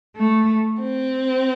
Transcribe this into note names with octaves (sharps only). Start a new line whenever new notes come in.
A3
C4